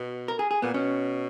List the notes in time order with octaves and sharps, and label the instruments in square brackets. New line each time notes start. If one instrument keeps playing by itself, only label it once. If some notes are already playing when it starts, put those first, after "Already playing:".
Already playing: [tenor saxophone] B2
[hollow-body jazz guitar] A#4
G#4
G#4
[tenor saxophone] A#2 [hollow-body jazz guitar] B3
[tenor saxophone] B2 [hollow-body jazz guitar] C#4